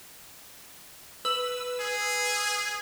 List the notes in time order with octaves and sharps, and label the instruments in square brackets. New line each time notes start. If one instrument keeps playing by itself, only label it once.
[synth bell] B4 E6
[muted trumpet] G#4